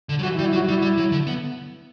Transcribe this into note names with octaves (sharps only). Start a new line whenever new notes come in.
D3
F#3
E3 F#4
E4
G3
E4
F#3
F#4
G3 E4
G3
F#3
D3
B3